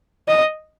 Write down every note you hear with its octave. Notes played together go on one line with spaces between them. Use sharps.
D#5